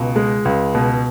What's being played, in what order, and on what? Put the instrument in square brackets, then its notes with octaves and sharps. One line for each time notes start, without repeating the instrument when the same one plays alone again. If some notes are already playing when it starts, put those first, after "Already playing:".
Already playing: [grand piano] C#2 B2
G#3
C#2
B2